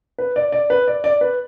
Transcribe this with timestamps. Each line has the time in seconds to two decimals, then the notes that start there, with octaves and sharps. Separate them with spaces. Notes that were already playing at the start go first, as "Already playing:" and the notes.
0.19 B4
0.36 D5
0.52 D5
0.70 B4
0.88 D5
1.04 D5
1.21 B4